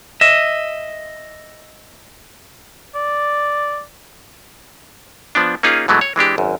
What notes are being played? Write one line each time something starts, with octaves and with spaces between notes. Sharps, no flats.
D#5 E5
D5
F3 B3 D4
A#3 C#4 D#4 F4 G#4
B2 E3 F#3 G#3 A3
C#5
E3 G#3 D4 G4
G#1 F#2